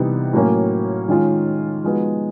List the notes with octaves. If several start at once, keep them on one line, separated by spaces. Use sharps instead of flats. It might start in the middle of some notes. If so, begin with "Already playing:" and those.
Already playing: C3 E3 G3 B3 D#4
A2 F#3 A#3 C#4
D#3 G#3 C#4 F4
F3 G#3 B3 D#4 F#4